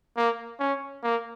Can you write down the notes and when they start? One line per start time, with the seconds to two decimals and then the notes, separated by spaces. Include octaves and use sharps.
0.17 A#3
0.60 C#4
1.03 A#3